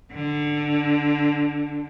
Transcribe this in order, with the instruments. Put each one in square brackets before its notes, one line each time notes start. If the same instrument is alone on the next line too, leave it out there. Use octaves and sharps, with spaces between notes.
[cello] D3